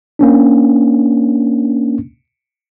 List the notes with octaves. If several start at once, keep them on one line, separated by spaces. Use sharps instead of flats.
A#3 C#4 D4